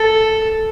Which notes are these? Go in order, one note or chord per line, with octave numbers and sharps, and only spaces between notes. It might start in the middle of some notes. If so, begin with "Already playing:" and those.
Already playing: A4